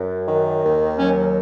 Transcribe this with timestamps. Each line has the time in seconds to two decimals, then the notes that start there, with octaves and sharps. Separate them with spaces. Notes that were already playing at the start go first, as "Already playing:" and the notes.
Already playing: F#2
0.27 D#3
0.64 D#2
0.99 F#3 C#4